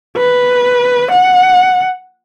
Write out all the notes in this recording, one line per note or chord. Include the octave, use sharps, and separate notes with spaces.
B4
F#5